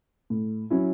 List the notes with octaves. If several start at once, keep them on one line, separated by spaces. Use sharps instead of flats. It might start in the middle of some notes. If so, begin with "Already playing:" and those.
A2
F#3 C#4 E4